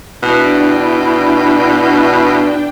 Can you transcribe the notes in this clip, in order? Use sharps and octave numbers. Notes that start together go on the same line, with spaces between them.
B2 D4 E4 G5